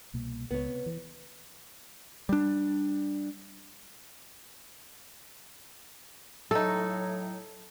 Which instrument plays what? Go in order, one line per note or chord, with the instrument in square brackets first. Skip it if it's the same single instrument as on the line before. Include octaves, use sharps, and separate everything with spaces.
[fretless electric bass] C2 B2 A#3
[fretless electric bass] C#2 [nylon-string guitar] B3 C#5
[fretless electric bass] C3
E3
[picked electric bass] G3 D4
[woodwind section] A2 F#3 [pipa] A3 D#4 [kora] A4